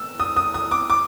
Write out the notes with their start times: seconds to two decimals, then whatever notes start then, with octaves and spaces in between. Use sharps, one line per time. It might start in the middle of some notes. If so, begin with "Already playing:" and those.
Already playing: E6
0.20 D#6
0.36 D#6
0.54 D#6
0.71 D6
0.90 D6